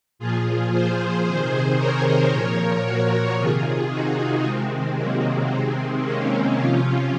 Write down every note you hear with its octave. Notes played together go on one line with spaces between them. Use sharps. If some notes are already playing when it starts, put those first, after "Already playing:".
A#2 F3 F4 G#4
G#4 C5
C3 D#3 G#4 C5
A#4 C#5
A#2 F3 A#4 C#5
F#4 A#4
C3 D#3 F4 G#4
D#4 F#4
C3 D#3 G#3 C4
F#3 A#3
C3 D#3 G#3 C4
A#3 C#4
C3 F3 C#4 F4